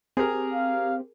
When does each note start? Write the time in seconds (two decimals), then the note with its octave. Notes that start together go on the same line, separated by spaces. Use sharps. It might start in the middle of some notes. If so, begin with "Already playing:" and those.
0.17 C4 G4 G#4 A#4
0.54 F5